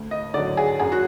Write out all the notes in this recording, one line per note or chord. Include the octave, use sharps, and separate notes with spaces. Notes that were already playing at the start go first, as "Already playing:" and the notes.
Already playing: D2
D#5
D3 F#3 D5
G#4
F#2 G#4
F#4